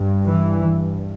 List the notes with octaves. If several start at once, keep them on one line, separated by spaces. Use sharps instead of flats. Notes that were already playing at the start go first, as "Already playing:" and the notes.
Already playing: G2
E3
G2